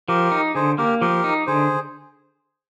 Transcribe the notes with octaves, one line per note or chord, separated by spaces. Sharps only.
F3 G4 A#4
D#4
D3 G#4 C5
A#3 G4 A#4
F3 G4 A#4
D#4
D3 G#4 C5